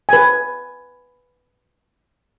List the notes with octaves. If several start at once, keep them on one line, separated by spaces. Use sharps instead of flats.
B4 G#5